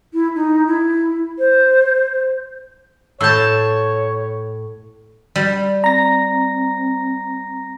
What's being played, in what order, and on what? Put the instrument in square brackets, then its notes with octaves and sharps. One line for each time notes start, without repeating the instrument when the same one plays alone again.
[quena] E4
D#4
E4
C5
[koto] A2 A5 [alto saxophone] C#5 [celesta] E6 G6
[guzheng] G3
[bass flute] C4 [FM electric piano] A#5 A#6